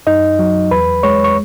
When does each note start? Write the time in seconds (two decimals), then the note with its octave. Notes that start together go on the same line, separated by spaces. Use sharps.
0.07 F#2 D#4 D#5
0.39 F#3
0.71 E2 B4 B5
1.03 G#3 C#5 C#6
1.24 C#6